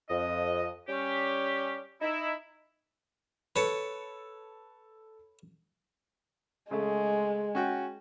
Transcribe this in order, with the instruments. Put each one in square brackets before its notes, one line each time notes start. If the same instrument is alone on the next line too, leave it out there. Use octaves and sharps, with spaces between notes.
[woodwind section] F2 D#5
G3 C#4 G4
D#4 E4
[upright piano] A4 C#7 [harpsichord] B4 C#5 A5
[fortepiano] C#3 A3 [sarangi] G#3
[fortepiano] C#4 F#4 G5